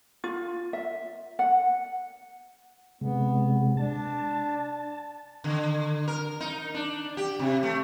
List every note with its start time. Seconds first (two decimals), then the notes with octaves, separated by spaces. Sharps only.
0.24 F4
0.73 E5
1.39 F#5
3.01 C3 G#3 B3
3.77 D4 A5
5.44 D3
6.08 A#4
6.40 D#4
6.74 D4
7.17 G4
7.39 C3
7.63 A3